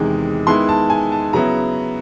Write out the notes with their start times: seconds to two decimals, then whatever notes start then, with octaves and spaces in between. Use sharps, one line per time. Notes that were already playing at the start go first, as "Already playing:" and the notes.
Already playing: E2 C3 D#3 G#3
0.47 D#3 G#3 B3 E4 C6
0.69 A5
0.90 G#5
1.12 A5
1.33 C#3 F#3 B3 E4 A#5